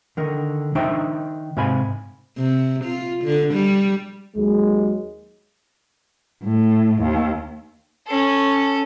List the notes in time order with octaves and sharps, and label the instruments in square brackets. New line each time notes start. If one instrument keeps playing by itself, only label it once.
[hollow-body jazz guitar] D3 D#3 A#4
D#3 D4 D#4 C5 E5 G5
G#2 C3 F5 G#5 B5
[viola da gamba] C3
F4
D3
G3
[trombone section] D#2 F#3 G#3
[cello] A2
D#2
[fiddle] C#4 A4